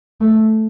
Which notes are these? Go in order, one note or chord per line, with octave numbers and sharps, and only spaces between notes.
A3